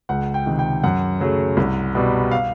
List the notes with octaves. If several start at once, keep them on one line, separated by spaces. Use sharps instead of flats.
C#2 F#5
G5
C3 D#3
G5
F#2 F#5
C#3 F#3 A3
C2
B2 G3
F5